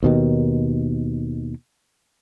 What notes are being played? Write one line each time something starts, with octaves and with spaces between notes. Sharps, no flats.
D#2 B2 D#3